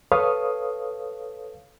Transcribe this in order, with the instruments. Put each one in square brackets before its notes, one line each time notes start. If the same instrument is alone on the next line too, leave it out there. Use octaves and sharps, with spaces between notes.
[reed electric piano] A4 B4 C#5 F5 D#6